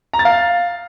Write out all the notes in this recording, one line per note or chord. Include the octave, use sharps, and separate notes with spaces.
A#5
A6
F5